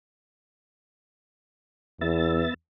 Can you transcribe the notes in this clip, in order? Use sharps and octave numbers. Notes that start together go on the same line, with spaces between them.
E2 B3 E5 A6